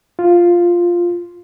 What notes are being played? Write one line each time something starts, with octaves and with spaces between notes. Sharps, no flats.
F4